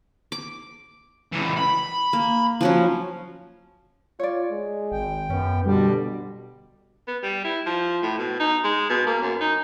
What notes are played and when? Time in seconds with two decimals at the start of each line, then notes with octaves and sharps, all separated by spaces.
0.32 D6
1.33 C#2 E3
1.57 B5
2.13 A#3
2.61 F3 F#3 C#4
4.20 F4 C#5 D5
4.52 G#3
4.92 G#1 G5
5.30 F#2 B3 C#4
5.66 B2 D3 G3 G4
7.08 B3
7.23 G3
7.45 E4
7.66 F3
8.03 A2
8.19 B2
8.40 D#4
8.64 G#3
8.90 B2
9.07 A#3
9.22 F#2
9.41 D#4